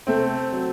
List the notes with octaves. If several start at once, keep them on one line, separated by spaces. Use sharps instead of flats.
C3 A3 C4
F#3